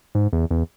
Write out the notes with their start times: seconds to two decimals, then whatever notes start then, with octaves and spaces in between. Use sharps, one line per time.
0.15 G#2
0.33 E2
0.51 E2